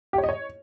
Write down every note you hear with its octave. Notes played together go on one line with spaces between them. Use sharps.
G4
C#5
D#5
C#5